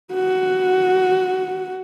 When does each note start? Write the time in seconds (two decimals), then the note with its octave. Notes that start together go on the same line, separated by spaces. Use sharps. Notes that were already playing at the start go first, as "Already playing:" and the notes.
0.14 F#4